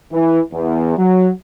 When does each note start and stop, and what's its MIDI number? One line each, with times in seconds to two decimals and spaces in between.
0.12 0.40 52
0.52 0.95 40
0.98 1.30 54